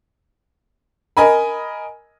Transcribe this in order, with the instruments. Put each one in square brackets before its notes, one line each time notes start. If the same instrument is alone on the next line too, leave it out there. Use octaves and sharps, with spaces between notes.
[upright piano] A#4 D#5 G#5 B5